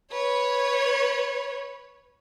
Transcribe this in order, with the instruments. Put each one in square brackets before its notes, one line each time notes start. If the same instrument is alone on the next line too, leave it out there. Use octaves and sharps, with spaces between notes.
[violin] B4 C#5